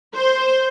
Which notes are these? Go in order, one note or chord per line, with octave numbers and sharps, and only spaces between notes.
C5